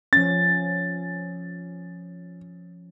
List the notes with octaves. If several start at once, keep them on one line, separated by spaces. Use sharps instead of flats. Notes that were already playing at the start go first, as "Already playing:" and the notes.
F3 C#4 A6